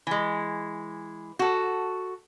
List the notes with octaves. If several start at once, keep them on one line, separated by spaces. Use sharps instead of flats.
E3 G#3
F#4 A4